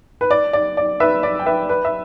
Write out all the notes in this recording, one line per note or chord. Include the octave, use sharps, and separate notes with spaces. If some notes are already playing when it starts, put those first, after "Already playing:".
B4
D5
D5
D5
B4 E5
D5
G5
B4 E5
B4
E5